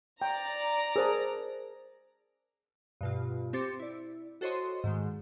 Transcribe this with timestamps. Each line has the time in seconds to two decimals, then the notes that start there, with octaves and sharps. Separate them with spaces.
0.22 D5 G5 A#5
0.96 G#4 A#4 C5 A5
3.01 G2 B2 F4
3.53 C4 G4 C5 D6 A6 C#7
3.80 E4 D5
4.41 F#4 A4 C5 C#5 D#5 C6
4.84 G#2 D#3 G#3